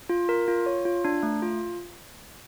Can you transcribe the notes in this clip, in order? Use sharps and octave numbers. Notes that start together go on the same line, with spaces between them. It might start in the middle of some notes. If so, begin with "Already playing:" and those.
F4
A#4
F4
C#5
F4
D4
A3
F4